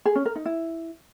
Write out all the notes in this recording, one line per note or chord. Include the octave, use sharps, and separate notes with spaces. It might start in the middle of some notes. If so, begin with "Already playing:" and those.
G#4
C#4
A#4
D#4
E4